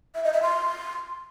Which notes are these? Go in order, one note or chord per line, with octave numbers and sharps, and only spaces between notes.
E5
D#5
E5
C6